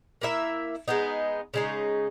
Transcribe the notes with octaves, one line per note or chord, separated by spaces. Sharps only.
A#3 E4 A#4 E5
G#3 B3 D#4
C#3 G#3 D#4